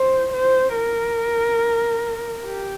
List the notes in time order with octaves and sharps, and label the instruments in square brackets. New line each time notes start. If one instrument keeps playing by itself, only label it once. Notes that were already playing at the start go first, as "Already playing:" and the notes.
Already playing: [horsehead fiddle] C5
C5
A#4
G4